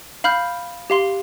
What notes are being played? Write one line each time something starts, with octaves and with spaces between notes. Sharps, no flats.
F5 B5 F6 G6
G4 F5 C6